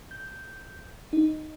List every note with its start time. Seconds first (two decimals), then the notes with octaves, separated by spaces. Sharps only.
0.11 G6
1.13 D#4